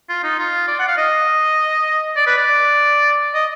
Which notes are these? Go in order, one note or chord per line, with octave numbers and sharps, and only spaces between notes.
F4
D#4
F4
D5
F#5
F5
D#5
D5
B4
D5
D#5